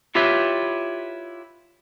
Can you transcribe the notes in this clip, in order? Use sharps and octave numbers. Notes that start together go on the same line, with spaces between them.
E4 F4 G4 B4 C#5 E5